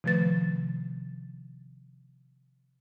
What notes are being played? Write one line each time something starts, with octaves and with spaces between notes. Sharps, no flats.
C3 D#3 F3 A3 B4 A6